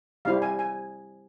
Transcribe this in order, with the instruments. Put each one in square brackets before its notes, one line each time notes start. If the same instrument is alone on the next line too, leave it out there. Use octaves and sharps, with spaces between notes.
[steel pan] G3 C4 E4 G4 F5
G#5
G#5